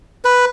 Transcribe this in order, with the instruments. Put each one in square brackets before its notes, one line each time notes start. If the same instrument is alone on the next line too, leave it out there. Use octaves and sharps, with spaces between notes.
[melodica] B4